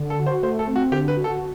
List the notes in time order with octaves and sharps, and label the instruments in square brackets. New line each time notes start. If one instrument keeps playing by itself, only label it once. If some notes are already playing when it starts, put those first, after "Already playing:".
Already playing: [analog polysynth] D3
[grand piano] A4
[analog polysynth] F#4
[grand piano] C5
[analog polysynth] A3 [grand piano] C5
[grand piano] A4
[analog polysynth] C4
[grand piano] F#4
[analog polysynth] D3 [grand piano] G4
[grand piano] B4
[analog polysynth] F#4
[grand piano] A4